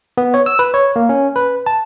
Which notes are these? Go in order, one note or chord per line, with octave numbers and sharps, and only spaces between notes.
B3
C#5
E6
B4
C#5
A#3
C#4
B4
A5